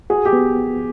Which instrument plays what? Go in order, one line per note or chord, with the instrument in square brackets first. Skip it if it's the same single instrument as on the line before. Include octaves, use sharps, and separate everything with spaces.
[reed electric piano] F#4 [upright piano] G#4
[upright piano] G4
[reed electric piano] B3